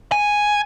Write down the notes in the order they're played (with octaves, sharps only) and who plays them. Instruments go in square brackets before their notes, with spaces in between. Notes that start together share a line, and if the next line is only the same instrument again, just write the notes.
[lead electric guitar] G#5